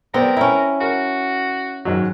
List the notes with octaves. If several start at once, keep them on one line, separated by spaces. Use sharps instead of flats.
B3 C4 A#4 D5
C#4 E4 A#5
F#4 A#4
G#2 D#3 F#3